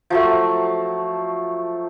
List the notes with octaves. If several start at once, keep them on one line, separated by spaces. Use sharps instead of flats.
F3 F#3 A3